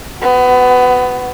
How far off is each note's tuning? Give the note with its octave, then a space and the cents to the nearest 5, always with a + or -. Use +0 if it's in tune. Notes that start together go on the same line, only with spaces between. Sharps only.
B3 +20 F#4 +0